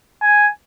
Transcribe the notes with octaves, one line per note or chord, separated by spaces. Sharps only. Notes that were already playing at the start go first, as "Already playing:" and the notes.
G#5